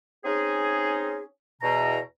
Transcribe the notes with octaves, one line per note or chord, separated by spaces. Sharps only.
C4 C#4 D#4 G#4
E2 B2 A#5